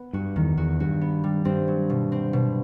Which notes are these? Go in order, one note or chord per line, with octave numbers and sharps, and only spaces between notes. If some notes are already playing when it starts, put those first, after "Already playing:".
Already playing: B3
G2 F#4
E2 D#3
E2 F#4
G2 F#4
B3
G3
G2 C4
F#3
B2
C4
B2